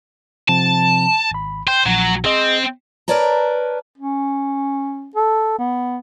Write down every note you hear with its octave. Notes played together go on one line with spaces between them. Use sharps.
C3 F3 C4 A5
G#1 B5
C5 G5 G6
A#1 F#3
C4 G#4 D#5
A#4 B4 C#5 D5 A5 A#5
C#4
A4
B3